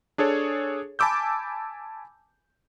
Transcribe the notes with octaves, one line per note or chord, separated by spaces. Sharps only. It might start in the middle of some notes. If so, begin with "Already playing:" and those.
D4 G#4 A4 C#5
G#5 A5 B5 D6 E6 G6